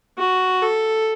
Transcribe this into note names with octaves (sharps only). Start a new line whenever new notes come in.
F#4
A4